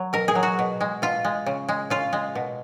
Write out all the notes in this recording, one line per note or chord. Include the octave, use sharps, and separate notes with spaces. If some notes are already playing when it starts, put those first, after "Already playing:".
Already playing: F#3
B2 A#4
G#4
F#3
F#4
B2
G#3
B2 F4
G#3
C#3
G#3
C#3 F4
G#3
B2